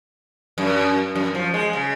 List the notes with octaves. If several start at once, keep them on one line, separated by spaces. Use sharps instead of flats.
F#2
F#2
F3
G#3
C#3